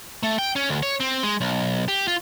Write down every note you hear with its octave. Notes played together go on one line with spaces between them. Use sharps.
A3
G5
C#4
D2
C#5
C4
G#3
B1
G4
F4